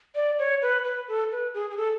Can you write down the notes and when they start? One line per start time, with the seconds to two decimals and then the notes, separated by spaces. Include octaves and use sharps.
0.15 D5
0.39 C#5
0.62 B4
0.84 B4
1.08 A4
1.31 B4
1.54 G#4
1.70 G#4
1.77 A4